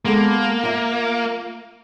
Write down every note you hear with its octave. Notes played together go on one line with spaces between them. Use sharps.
G#3 A#3 B3 A4
F4 E5